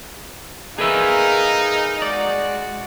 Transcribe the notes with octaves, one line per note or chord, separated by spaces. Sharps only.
D#4 G#4 A#4 B4 E5 F5 G#5
G#3 F#4 D5